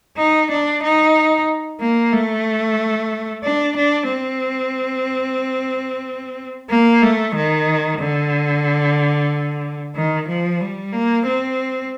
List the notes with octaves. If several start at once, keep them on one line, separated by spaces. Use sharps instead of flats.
D#4
D4
D#4
A#3
A3
D4
D4
C4
A#3
A3
D#3
D3
D#3
F3
G3
A#3
C4